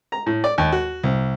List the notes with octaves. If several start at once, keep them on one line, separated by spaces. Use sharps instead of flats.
A#5
A2
D5
D#2
F#4
C2